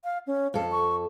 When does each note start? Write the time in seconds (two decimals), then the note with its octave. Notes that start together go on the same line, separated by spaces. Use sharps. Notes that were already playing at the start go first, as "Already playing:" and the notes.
0.04 F5
0.27 C#4
0.54 F2 A4 F5
0.72 C#6